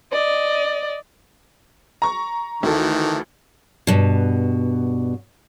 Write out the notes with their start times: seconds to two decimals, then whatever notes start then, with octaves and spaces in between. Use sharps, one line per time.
0.13 D5 D#5
2.02 A#5 C#6
2.63 D2 D#3 E3 A4
3.87 G2 B2